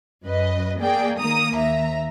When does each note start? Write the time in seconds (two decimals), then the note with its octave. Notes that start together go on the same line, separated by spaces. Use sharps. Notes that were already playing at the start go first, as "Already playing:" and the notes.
0.24 F#2 B4 D#5
0.79 A#3 G#4 D5 G5
1.19 D#3 A#3 A#5 D#6
1.54 D#2 E5 A#5